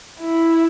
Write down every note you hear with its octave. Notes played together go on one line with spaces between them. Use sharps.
E4